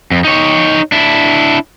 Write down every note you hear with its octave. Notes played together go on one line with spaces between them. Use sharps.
F2
D#4 C#5
D4 E4